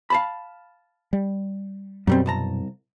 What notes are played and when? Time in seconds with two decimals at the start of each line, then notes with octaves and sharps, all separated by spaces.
0.10 F5 A5 B5
1.13 G3
2.07 F#2 B2 F#3 G3 C4
2.26 C2 A5 A#5